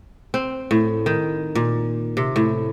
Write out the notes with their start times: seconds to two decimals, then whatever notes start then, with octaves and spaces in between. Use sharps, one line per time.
0.34 C4
0.71 A2
1.06 D#3
1.55 A#2
2.17 C3
2.36 A2